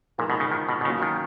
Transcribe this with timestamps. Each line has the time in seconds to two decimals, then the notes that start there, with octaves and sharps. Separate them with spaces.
0.18 A#2 F3 G#3 D#4 A#4
0.30 B2
0.40 C#3
0.52 D#3
0.69 B2
0.81 B2
0.84 C#3 F#3 A#3 C#4 F4
1.02 D#3